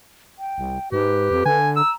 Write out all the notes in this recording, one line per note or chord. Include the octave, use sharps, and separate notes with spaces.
G5
C2
G#2 G4 B4
F2
D3 G#5
A#5 E6